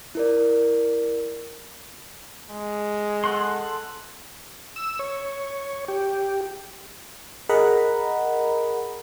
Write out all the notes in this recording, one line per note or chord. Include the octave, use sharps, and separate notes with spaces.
E4 A#4 D5
G#3
A4 F#5 C6
E6
C#5
G4
G#4 A#4 D#5 F#5 A#5 B5